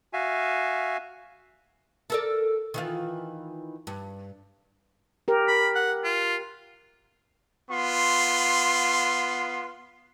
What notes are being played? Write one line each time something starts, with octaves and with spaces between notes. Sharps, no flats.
F#4 E5 F5 G#5
A4 A#4 D5
D#3 E3 F4
G2
G4 A#4
B5
F#5
F4
B3 F4 C6